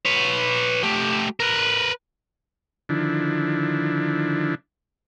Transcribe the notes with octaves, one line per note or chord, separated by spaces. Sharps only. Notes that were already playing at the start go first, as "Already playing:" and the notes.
B4 C#5
A3 G4
A#4 B4
D3 D#3 F3 D4 E4